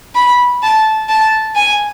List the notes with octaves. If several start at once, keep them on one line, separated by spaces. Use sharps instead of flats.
B5
A5
A5
G#5